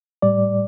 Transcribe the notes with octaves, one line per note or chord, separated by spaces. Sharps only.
A2 G3 D5